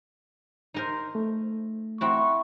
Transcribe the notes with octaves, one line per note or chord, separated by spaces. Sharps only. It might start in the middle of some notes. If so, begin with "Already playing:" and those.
D#4 A#4 C5
A3
C4 E4 F#4 C#6